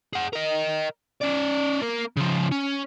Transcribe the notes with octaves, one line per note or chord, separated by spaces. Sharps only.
G#4 F#5
A#4 D#5
C#4 D5
A#3 A#4
C#3 F3
C#4